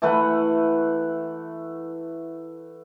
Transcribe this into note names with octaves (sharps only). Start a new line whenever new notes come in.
E3 A3 B4 F#5